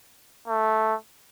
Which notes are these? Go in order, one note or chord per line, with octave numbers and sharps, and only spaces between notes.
A3